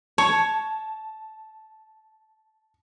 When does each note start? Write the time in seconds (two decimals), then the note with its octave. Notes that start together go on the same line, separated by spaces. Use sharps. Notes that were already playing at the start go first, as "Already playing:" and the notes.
0.18 C#5 A5